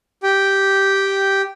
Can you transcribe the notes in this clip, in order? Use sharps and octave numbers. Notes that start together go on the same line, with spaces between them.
G4 G5